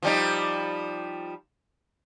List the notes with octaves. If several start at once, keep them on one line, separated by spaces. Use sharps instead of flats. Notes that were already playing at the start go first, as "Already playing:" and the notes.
F3 G3 D#4